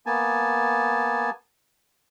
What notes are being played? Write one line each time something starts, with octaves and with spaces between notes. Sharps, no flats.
A#3 B3 G#5 A5